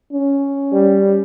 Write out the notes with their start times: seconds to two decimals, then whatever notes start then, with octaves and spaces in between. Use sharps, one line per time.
0.13 C#4
0.72 G3